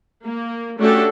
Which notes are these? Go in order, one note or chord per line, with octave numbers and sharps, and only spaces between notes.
A#3
A3 C#4 D4 F#4 G4 A4